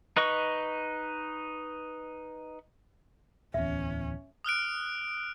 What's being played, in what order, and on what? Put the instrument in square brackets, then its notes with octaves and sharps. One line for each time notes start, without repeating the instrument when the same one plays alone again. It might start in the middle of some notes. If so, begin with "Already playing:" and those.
[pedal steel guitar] D#4 B4 D#5 C#6
[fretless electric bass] D1 E2 [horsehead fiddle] C#4 [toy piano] E5
[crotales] D#6 F6 F#6 D7